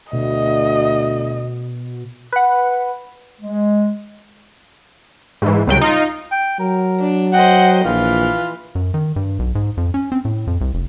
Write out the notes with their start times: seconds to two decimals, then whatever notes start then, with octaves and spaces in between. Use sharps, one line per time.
0.13 D2 B2 D#5
2.32 B4 F#5
3.41 G#3
5.42 G#2 E3
5.67 C#2 F#3 G5
5.81 D#4 F4
6.31 G5
6.60 F#3 A#4
6.99 D4
7.33 C5 D#5 F#5 G5
7.85 A#1 E3 F4
8.75 F#2
8.94 D#3
9.16 G2
9.39 B1
9.55 G#2
9.77 F2
9.94 C#4
10.12 C4
10.25 A2
10.47 F2
10.61 C2
10.74 F1